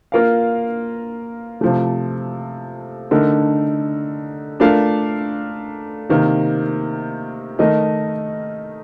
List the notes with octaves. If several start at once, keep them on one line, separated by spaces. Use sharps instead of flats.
A#3 F4 A#4 F5
C3 F3 A3
D3 A3 D#4 A#4
A3 D4 F4 A#4 F5
C3 D#3 A#3
D#3 A3 D#4 A#4 D#5